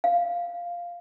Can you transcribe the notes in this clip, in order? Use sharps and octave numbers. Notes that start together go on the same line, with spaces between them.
F5